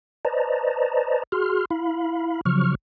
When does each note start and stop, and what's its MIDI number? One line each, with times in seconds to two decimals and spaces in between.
0.25 1.23 71
0.25 1.23 72
0.25 1.23 74
0.25 1.23 75
0.25 1.23 81
0.25 1.23 82
1.32 1.65 66
1.32 1.65 68
1.32 1.65 84
1.32 1.65 89
1.70 2.41 64
1.70 2.41 77
1.70 2.41 83
2.45 2.75 49
2.45 2.75 53
2.45 2.75 54
2.45 2.75 85
2.45 2.75 89